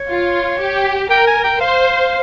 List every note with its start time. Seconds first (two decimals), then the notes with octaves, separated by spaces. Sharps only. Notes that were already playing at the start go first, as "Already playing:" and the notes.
Already playing: C#5
0.09 F4
0.60 G4
1.10 A#4 G5
1.27 G#5
1.44 G5
1.61 C5 F5